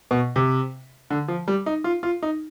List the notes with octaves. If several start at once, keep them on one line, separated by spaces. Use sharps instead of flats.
B2
C3
D3
F3
G3
D#4
F4
F4
D#4